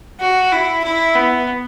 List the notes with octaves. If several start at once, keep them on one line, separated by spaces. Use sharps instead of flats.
F#4
E4
E4
B3